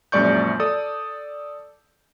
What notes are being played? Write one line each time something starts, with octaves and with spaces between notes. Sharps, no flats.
A#1 F#2 G#3 D5 C#6 G6
A4 D5 D#6